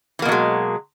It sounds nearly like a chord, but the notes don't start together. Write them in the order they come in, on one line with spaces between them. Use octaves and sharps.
E3 A#3 B2 F#3 G#3